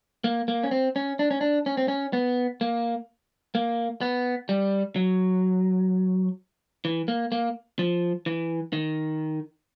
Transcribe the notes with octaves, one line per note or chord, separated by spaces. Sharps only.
A#3
A#3
C#4
C4
C#4
D4
C#4
D4
C#4
C4
C#4
B3
A#3
A#3
B3
G3
F#3
E3
A#3
A#3
F3
E3
D#3